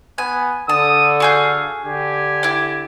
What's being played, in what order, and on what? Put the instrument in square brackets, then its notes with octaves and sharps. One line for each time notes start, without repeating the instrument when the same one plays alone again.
[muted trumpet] B3 [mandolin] G#5
[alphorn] D3 [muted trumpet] A4 [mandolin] A5 [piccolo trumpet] D#6
[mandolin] F#4 G#4 G6 [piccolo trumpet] F5
[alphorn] D3 [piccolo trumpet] G4 [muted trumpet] G#5
[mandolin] E4 D5